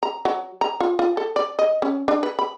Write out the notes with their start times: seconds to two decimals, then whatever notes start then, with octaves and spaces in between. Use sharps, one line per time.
0.03 A#5
0.25 F#3
0.61 A#5
0.80 F4
0.99 F4
1.17 A4
1.36 D5
1.59 D#5
1.82 C#4
2.08 D4
2.23 B4
2.39 B5